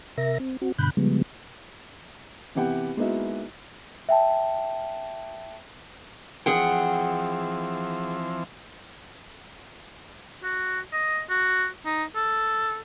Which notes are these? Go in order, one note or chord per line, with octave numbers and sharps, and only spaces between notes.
C3 A#4 E5 A#6
C4
C4 F#4
G2 B2 D3 B5 F#6 G6
C#3 F3 G3 G#3 B3
C3 E3 B3 G4 F#5 G5
G#3 A#3 B3 D#4 E4 F#4
E5 G5 A5
E3 F3 C4 G#4 F#5 G5
F#4
D#5
F#4
D#4
A4